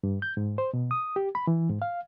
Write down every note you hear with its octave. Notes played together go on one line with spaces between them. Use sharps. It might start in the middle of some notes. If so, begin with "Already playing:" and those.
G2
G6
G#2
C5
B2
D#6
G4
B5
E3
G#2
F5